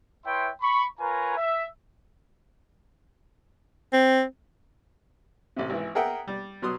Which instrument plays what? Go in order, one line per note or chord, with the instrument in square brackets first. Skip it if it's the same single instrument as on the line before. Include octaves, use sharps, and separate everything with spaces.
[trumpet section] E4 B4 C#5 E5 G5 C6
B5 C#6
F4 A#4 B4 C#5 G#5 A#5
E5
[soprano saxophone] C4
[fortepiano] A1 C3
G#1 E3
G#4 A#4 E5 F#5 G5
G3
B2 F#3 C6 D#6